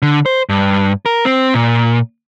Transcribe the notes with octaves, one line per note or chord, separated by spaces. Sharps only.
D3
C5
G2
A#4
C4
A#2